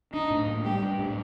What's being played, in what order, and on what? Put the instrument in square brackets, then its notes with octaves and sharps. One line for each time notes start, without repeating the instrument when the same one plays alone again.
[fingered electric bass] D4 [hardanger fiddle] D#4
[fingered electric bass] A2
A#3
[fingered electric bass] G3 [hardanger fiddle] G4
[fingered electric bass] D4
A2